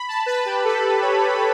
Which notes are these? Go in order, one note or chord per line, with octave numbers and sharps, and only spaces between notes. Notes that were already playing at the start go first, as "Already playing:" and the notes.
Already playing: B5
A5
B4
G4
A4
C#5